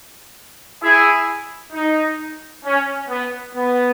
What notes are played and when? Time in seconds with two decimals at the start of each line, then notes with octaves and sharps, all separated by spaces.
0.82 E4 G#4
1.73 D#4
2.65 C#4
3.09 B3
3.55 B3